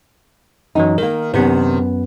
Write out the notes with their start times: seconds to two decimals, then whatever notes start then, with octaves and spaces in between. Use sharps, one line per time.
0.75 F#2 E3 F#3 D#4
0.98 D#3 A#3 A#4
1.34 F#2 C3 D#3 B3 B4